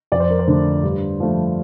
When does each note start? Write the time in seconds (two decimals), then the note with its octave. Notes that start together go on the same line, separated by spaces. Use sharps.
0.12 F2 D5
0.20 C5
0.30 A#4
0.39 C5
0.47 D3 A3
0.83 G2
1.20 F3 A3